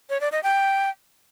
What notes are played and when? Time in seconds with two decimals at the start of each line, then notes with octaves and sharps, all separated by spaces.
0.10 C#5
0.21 D5
0.32 D#5
0.43 G5